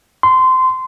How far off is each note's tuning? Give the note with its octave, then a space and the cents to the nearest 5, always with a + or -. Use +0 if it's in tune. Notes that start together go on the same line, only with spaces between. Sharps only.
C6 -20